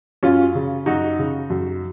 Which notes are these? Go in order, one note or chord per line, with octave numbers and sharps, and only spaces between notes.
F#2 C#4 F4
C#3
F#2 D#4 F#4
C#3
F#2